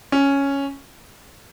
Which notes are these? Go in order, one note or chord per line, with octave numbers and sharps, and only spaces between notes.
C#4